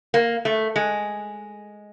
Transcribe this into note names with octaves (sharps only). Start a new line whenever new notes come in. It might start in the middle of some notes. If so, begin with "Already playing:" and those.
A#3
A3
G#3